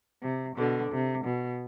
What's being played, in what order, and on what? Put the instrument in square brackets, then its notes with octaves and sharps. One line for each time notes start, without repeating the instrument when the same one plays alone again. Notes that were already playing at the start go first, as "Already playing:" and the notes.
[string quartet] C3
B2 D3
C3
B2